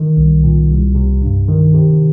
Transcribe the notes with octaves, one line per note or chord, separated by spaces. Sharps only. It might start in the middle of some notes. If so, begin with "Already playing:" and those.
Already playing: D#3
C2
A#2
C2
C3
G2
D#3
C3